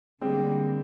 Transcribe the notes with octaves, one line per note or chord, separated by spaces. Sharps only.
D3 G3 G#3 A#3 C4